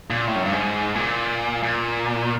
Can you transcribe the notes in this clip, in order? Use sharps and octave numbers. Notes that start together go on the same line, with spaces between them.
A#2
A2
F#2
G2
G#2
A#2
A#2